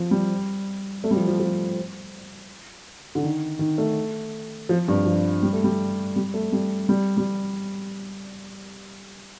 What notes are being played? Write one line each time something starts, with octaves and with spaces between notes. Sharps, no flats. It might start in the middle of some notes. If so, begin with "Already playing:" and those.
Already playing: F3
G3
A3
G3
F3
F3
F3
D3
D#3
D#3
A3
F3
G2
F3
G3
A3
G3
G3
A3
G3
G3
G3